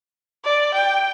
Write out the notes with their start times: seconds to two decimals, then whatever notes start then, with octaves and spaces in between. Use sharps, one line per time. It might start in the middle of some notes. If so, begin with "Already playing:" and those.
0.45 D5
0.75 G5